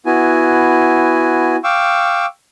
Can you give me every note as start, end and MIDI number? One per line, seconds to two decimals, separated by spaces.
0.06 1.56 59
0.06 1.56 64
0.06 1.56 66
0.06 1.56 80
1.64 2.26 77
1.64 2.26 79
1.64 2.26 85
1.64 2.26 86
1.64 2.26 88